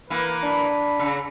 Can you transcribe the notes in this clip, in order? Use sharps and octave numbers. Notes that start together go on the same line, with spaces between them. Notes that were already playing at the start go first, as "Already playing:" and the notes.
E3 A#3 B4
D4 B5
C#3